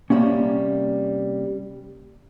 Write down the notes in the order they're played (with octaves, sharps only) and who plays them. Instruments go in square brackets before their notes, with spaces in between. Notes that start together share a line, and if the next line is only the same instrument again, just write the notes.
[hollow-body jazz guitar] C3 F3 G3 A#3 C#4